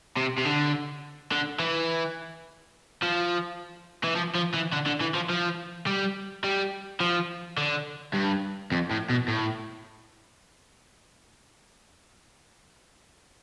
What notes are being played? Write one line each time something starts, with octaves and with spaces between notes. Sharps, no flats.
C3
C3
D3
D3
E3
F3
E3
F3
F3
E3
D3
D3
E3
F3
F3
G3
G3
F3
D3
G2
F2
A2
B2
A2